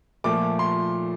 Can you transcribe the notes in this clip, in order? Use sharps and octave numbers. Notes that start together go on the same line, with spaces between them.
A#2 F3 A3 D6
C6